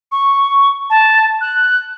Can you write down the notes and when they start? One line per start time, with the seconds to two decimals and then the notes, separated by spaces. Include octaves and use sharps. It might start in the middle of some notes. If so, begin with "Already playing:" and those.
0.11 C#6
0.89 A5
1.40 F#6